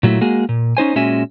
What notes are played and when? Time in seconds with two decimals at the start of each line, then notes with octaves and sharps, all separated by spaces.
0.03 A#2 F#3 A3 E4
0.21 G#3 A#3 F#4 G#4
0.49 A#2
0.77 C#4 D#4 C5 G#5
0.96 A#2 G#3 C#4 F#4 E5 G#5